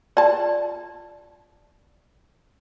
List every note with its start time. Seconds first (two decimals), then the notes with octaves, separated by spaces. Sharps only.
0.17 F4 D5 A5